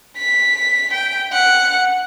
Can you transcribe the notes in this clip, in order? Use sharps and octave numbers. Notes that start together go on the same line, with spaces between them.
B6
G5
F#5